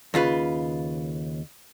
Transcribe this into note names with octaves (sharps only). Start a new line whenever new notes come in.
D#2 C#3 F4 B4